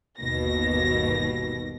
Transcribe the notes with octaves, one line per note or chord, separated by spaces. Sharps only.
G1 D#2 B2 A#6